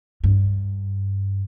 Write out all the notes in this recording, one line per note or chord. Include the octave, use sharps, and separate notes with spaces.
G2